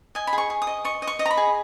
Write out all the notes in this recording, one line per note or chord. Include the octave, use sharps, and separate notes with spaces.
D#5 G#5
B5
G#4
C#6
G#4
D#6
D#5
D#5 C#6
D#5
C#6
D#5
A#5
B5
G#4